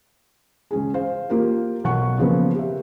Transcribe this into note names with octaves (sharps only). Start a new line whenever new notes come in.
C#2 C#4 G#4
C5 F5
A#3 F4 G4 A#4
B1 F#5 C#6
C#3 F3 A#3 B3
G4 E5